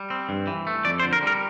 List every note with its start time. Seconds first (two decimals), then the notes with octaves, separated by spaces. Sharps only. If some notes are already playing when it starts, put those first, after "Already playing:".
Already playing: G3
0.10 C4
0.29 G2
0.47 E3
0.67 A3
0.85 F2 D5
1.00 C5
1.03 D3
1.13 A#4
1.23 G3 A#4